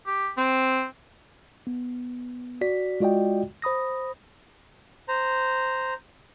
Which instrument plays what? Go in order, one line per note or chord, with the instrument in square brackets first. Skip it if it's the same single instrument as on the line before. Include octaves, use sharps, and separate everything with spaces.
[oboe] G4
C4
[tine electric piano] B3
F#4 D5 B6
G#3 F4 F#4 D5 D#5 G5
C5 B5 D#6 A#6
[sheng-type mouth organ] C5 A#5